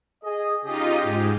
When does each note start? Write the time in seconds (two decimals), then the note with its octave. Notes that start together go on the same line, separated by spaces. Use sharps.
0.24 G#4 D#5
0.65 C#3 D#4 F4 G4 G#4 D#5
1.03 G#2